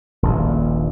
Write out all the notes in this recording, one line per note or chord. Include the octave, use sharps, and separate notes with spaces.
D#1 A#1 G2